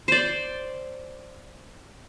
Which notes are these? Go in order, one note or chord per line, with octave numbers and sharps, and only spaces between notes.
C5 D5